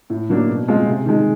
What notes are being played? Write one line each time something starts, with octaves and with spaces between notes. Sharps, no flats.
A2
F#3 A#3 D4
B2
G#3 C4 F4
C3
D#3 G#3